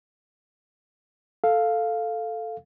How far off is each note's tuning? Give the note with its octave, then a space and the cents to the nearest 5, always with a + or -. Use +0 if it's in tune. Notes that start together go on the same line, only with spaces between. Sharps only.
A4 +0 F5 +0